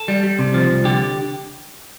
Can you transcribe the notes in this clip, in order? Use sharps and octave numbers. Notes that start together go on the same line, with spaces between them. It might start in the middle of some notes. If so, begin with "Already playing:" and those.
Already playing: A4
G3
G3
C3
F3
C2
D3 G4